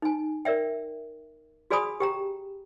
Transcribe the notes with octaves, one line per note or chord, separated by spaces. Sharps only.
D#4 G#5
A#4 D5 E5 G5
F#4 G#4 D5 G#5 B5 D#6
G4 G5 A#5